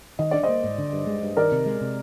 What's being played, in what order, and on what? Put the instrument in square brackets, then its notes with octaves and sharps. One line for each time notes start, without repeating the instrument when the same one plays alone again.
[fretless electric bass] D#3 [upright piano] D#5
[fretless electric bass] D4 [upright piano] D5
[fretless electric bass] A#3 [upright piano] C5 D#5
[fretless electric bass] G#2
D3
G2
G#3
G2
[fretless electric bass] D#3 [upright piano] A#4 D5
[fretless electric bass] C3
G#3
C3